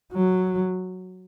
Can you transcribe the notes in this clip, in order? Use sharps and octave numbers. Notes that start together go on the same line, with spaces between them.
F#3